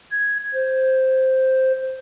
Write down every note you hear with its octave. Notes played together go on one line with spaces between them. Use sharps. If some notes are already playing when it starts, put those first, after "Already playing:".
G#6
C5